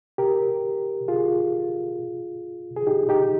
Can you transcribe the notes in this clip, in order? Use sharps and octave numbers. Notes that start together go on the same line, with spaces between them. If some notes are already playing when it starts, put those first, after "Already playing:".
G4 A#4
F4 G#4
G#4
D#4 G4
D#4 G4